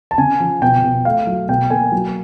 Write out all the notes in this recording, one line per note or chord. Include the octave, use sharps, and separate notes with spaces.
A5
C#3 G#5
F3
B2 G5
B2
A3 F5
F#3
B2 G5
A#3 G#5
F#3